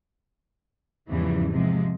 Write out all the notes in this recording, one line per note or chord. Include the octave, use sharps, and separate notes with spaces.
E2 G#2 C#3 E3 F3 G3
C3 F3 G#3